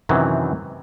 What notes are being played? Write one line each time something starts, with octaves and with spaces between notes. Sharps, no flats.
F#2 C3 D#3 E3 F#3